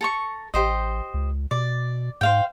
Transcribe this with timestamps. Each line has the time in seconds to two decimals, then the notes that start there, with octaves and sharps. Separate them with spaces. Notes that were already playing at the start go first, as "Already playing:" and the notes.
0.01 A4 A#5 C#6
0.54 A1 G4 C5 D#5
1.14 C#2
1.51 B2 D5
2.21 G#2 C5 F5 G5